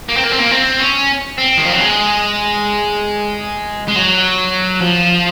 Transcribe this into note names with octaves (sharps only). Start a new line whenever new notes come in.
A#3
C4
A#3
C4
A#3
C4
C#4
C4
D#3
F3
F#3
G#3
G#3
F#3
F3